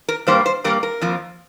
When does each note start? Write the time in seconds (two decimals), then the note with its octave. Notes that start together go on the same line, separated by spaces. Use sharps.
0.08 A#4
0.27 G2 G3 A#3 C5
0.46 C5
0.64 G2 G3 A#3 A#4
0.83 A#4
1.01 F2 F3 A#3